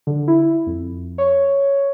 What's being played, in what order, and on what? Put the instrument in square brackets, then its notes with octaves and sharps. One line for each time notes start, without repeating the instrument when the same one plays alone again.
[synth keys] D3
E4
F2
C#5